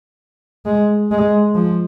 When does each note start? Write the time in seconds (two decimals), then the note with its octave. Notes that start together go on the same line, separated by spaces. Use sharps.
0.66 G#3
1.11 G#3
1.55 F3